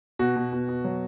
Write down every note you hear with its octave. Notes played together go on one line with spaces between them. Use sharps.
B2 F#4
B2
B2
B2
F#3